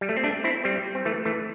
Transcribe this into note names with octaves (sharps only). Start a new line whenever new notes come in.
G3
A3
C4
A3 D4
C4 E4
G3 C4
C4
E3 A3
E3 A3